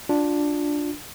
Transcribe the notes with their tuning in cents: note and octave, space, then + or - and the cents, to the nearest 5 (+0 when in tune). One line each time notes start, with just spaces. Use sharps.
D4 +0 F4 +20